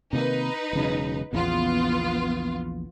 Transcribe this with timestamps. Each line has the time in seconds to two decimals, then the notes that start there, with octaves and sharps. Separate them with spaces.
0.13 C3 D#3 A#3 D#4 B4
0.73 E1 C#3 F#3
1.33 A#1 E2 C#3 B3 F4